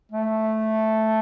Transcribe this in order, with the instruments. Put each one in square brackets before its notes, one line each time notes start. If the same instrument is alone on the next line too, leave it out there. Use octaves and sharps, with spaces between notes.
[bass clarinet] A3